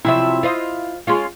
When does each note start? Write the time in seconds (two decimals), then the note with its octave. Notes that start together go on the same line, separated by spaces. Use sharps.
0.05 C3 F3 F#3 E4 E5
0.43 F4 C5 D#5
1.07 G#3 C#4 F4